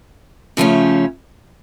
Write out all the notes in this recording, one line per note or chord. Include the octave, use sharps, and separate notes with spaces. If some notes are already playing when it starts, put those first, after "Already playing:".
C#3 F3 A3 C#4